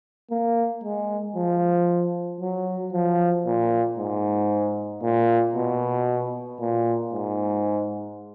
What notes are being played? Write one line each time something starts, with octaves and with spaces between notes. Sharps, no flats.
A#3
G#3
F3
F#3
F3
A#2
G#2
A#2
B2
A#2
G#2